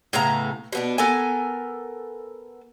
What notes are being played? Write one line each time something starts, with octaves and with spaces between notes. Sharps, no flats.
A2 C#3 B3 A#5
B2 B3 D4
B3 A4 A#4 G#5